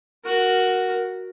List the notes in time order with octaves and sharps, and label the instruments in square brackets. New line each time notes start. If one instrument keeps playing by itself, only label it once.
[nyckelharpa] F#4 A#4